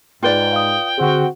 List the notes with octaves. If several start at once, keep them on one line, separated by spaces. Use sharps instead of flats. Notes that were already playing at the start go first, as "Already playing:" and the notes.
G#2 F4 B4 D5 G5
F5 D#6
D3 C4 F#4 G#4